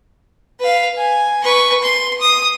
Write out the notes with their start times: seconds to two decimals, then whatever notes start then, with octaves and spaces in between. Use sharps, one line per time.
0.60 B4 F5
0.97 G#5
1.43 B4 C#6
1.82 C6
2.21 D#6